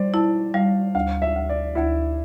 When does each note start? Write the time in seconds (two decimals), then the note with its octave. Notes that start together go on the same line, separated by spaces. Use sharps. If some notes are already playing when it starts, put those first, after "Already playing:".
Already playing: G3 C5 D5
0.14 E4 A5
0.54 G3 F5
0.95 D2 F5
1.22 E5
1.35 D2
1.49 D5
1.75 D2 E4